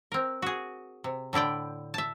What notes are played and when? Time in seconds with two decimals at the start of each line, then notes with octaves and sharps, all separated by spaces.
0.12 C4 A#4
0.42 F#4 G#4
1.04 C3
1.33 A2 D3 E4 D5 G5
1.94 E5 A5